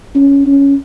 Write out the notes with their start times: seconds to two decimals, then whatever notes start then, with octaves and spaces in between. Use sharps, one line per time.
0.15 C#4
0.46 C#4